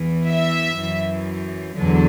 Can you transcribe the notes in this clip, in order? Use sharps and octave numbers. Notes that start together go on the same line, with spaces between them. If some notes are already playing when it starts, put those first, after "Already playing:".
Already playing: E2 E3
E5
F#2 E3
E2 D3 F#3